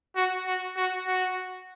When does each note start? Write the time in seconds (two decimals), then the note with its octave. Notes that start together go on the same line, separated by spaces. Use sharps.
0.16 F#4
0.47 F#4
0.77 F#4
1.07 F#4